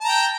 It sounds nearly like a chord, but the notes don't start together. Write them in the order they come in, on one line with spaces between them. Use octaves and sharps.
A5 A#5 G5